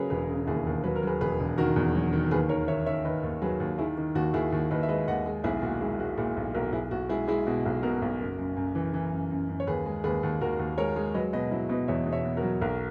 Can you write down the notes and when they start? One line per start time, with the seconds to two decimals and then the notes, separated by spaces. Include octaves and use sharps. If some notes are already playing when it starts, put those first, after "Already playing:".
Already playing: C#3 F#3 G#4 A#4 B4 C#5
0.10 E1 G#4 B4
0.29 C#3
0.47 D#2 E4 G#4
0.66 D#2
0.84 F#3 B4
0.96 A#4
1.03 F#3 G#4 B4
1.21 E1 G#4 B4
1.40 E1
1.58 D#3 F#4 A#4
1.76 E2
1.95 F#3
2.13 D#3
2.31 D#2 G#4 B4
2.49 D#3 A#4 C#5
2.68 D#3 C#5 E5
2.86 D#3 C#5 E5
3.05 D#3 B4 D#5
3.23 D#2
3.42 F#3 G#4 B4
3.60 D#2
3.78 D#3 E4 G#4
3.97 D#3
4.15 D#2 F#4
4.33 D#2 E4 G#4
4.52 D#2
4.71 D#2 B4 D#5
4.83 E5
4.88 G#3 B4 D#5
5.08 D#2 D#5 F#5
5.26 G#3
5.44 B1 E4 G#4
5.62 A#2 F#4
5.81 G#3 E4
5.99 G#3 F#4
6.17 A#2 E4 G#4
6.37 B1
6.54 B1 F#4 A#4
6.72 B1 E4 G#4
6.91 B1 F#4
7.09 G#3 E4 G#4
7.28 G#3 E4 G#4
7.47 B2 F#4
7.66 B1
7.83 B2 F#4 A#4
8.02 B1
8.20 F#1
8.38 F#2
8.56 F#2
8.75 E3
8.94 E3
9.12 F#2
9.31 F#2
9.49 F#2
9.60 C#5
9.67 D#2 G#4 B4
9.86 G#3
10.04 D#2 G#4 B4
10.23 D#2
10.41 D#2 F#4 A#4
10.59 D#2
10.77 G#3 A#4 C#5
10.96 G#3
11.14 F#3 B4 D#5
11.33 B2 B4 D#5
11.51 F#3 E4
11.69 B2 B4 D#5
11.88 E2 C#5 E5
12.06 B2
12.12 C#5 E5
12.25 B2
12.37 F#4 A#4
12.43 F#3
12.61 B1 F#4 A#4